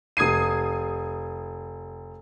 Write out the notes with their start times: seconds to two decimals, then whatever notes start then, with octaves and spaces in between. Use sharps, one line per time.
0.17 F1 D#6 G#6 C7 D#7